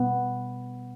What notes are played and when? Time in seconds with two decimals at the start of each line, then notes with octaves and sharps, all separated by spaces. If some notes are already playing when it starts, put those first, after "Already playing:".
Already playing: B2 G3 B3